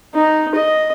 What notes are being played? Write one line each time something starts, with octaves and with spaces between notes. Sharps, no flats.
D#4
D#5